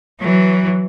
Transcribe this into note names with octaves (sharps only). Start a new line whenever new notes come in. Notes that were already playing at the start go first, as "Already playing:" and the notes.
E3 F#3